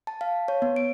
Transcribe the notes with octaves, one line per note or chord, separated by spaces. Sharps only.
A5
F5
C#5
B3
D7